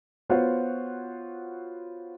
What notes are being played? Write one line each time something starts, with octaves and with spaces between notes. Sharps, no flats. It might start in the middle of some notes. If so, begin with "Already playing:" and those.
B3 F4 F#4 C5 C#5 F#5